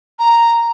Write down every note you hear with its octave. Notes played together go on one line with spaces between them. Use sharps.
A#5